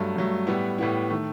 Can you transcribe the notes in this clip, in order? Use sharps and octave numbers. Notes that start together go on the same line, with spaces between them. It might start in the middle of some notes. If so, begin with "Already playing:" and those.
Already playing: G2 F#3 A3
G2 F#3 A3
A2 G3 B3 E4
A2 G3 B3 E4
D#3 A3